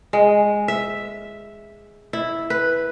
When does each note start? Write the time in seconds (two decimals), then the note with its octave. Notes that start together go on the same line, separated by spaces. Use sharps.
0.13 G#3
0.68 E5
2.13 E4
2.50 B4